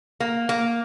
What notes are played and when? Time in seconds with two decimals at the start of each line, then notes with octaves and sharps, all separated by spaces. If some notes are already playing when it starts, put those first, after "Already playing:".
0.20 A#3
0.49 A#3